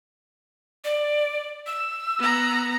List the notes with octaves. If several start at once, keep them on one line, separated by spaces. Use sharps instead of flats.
D5
E6
B3 A#5